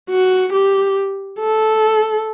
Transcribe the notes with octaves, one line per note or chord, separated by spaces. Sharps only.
F#4
G4
A4